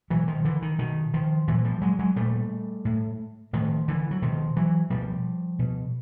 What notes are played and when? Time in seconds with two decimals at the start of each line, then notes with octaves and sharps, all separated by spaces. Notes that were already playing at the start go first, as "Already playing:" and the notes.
0.10 B2 E3 F#3
0.28 D#3 F3
0.45 D3 E3
0.62 D#3
0.79 B2 D#3
1.14 D#3 F3
1.48 A#2 E3 F#3
1.65 F3 G3
1.82 F#3 G#3
1.99 F#3 G#3
2.16 A#2 G3 A3
2.85 A2
3.53 A2 D#3 F3
3.88 D3 E3
4.11 F#3
4.22 B2 D#3 F3
4.56 E3 F#3
4.90 B2 F3 G3
5.59 B2